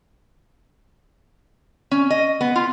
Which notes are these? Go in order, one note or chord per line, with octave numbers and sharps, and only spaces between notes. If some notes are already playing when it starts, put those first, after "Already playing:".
C#4
D#5
B3
F4